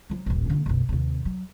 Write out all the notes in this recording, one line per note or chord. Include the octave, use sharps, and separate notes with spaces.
F3 F#3
D#1 A1
D3 A#3
F#1 B1
D#2 C3
F#3